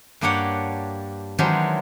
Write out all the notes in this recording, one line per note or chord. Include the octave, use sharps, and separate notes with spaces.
G2 A#3 D4 G4 C#5 F#5
D#3 E3 F#3 G#3 D4 C5